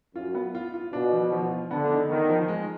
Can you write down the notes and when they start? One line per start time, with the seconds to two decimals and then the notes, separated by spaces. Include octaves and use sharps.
0.15 F#2 F4
0.35 B3
0.55 F4
0.74 F4
0.93 B2 D4
1.12 F3
1.32 F3
1.51 F4
1.71 D3 B3
1.90 D#4
2.10 D#3 B3
2.29 F3
2.48 G#3